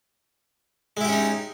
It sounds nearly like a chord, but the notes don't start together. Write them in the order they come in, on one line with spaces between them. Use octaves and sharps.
G#3 E4 G4 C#4 D#4